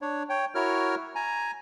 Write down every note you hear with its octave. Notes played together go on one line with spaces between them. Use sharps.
D4 C#5
C#5 G5
E4 F#4 A#4 C#5 F6
G#5 A#5